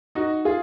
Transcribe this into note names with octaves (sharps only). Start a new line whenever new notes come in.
D#4 F#4
F4 G#4